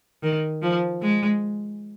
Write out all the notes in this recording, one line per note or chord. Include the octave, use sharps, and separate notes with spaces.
D#3
F3
G#3